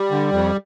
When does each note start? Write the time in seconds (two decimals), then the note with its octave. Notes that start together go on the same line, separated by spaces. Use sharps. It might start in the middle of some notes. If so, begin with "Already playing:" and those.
Already playing: G3
0.11 D3
0.32 F2